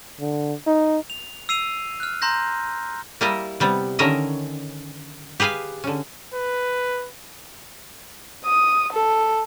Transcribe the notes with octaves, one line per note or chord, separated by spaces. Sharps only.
D3
D#4
F7
E6 C7 D#7 F7
F6 F#6
A#5 C6 G6 A#6
G3 A#3 E4 A#4 D#5
C3 G3 B3
D3 D#3 C#4 A#4 D#5 E5
G4 G#4 B4 F5 G#5
D3 C#4
B4
D#6
A4